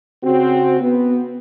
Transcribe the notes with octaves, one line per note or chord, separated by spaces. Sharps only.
C#3 C4 F#4
B3